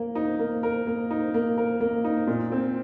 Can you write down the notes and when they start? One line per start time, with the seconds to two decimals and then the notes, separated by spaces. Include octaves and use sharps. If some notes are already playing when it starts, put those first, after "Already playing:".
Already playing: A#3 A#4
0.15 D#4
0.39 A#3
0.63 A#4
0.87 A#3
1.11 D#4
1.34 A#3
1.57 A#4
1.80 A#3
2.04 D#4
2.27 A#2
2.52 C4